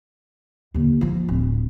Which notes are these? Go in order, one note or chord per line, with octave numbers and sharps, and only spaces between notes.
D#2 D3
F3 F4
D1